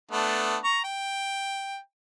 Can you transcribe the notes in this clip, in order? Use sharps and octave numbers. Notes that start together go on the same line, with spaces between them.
A3 B3 D4
A#5 C#6
G5